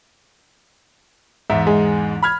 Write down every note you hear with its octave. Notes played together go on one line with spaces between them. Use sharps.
E2 G#2 E5
G#3
B5 F6 G#6